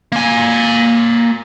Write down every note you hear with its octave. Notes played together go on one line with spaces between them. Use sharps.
A#3 G#5